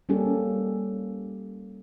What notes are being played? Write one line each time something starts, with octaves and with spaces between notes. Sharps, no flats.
G3 A#3 C#4 G4 A4